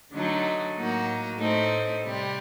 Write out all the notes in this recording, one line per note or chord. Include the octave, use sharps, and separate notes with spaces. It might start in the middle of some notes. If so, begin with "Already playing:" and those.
D3 F#3 A3 D#4
A2 F#3 A#3 D#4 F#4
A2 A3 C4 D#4
C3 G3 C4